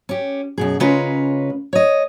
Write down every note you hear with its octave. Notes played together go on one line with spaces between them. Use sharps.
C#4 G4
F#2 B2 G#4
C#3 G#3 C#4 F4 A#4 B4
C#5 D#5